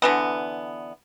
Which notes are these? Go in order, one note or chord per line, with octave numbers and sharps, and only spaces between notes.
D3 E3 B3